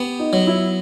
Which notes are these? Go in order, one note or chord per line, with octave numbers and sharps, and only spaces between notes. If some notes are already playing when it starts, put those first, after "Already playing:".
Already playing: B3 G4
D#4
F#3
E4